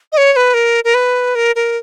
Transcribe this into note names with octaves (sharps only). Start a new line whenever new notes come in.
D#5
C#5
C#5
B4
A#4
A#4
B4
A#4
A#4